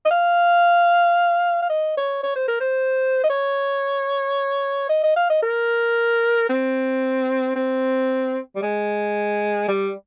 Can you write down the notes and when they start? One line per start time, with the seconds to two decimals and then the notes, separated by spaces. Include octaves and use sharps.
0.06 D#5
0.11 F5
1.62 F5
1.70 D#5
1.97 C#5
2.23 C#5
2.36 C5
2.48 A#4
2.60 C5
3.24 D#5
3.30 C#5
4.89 D#5
5.03 D#5
5.16 F5
5.30 D#5
5.43 A#4
6.49 C4
7.56 C4
8.56 G3
8.62 G#3
9.68 G3